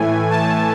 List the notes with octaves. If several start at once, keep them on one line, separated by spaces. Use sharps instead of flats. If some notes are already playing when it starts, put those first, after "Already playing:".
Already playing: A2 E3 A3 G#5
A5